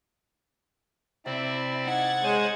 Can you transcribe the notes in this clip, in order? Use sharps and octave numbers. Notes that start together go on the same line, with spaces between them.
C3 C4 E4 D5
D#4 F#5 G#6 A6
G#3 C5 C#5 G#5